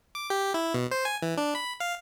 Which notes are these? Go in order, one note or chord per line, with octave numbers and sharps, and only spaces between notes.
D6
G4
E4
B2
C5
G#5
E3
D4
B5
F5